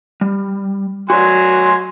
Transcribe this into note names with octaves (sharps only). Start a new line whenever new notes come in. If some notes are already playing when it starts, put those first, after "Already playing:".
G3
F#3 F#4 B4 D5 G#5 C6